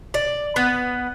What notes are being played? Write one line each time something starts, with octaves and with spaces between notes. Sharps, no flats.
D5
B3